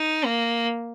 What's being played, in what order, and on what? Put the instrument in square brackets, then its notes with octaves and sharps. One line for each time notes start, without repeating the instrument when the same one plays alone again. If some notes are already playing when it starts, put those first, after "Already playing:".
Already playing: [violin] D#4
A#3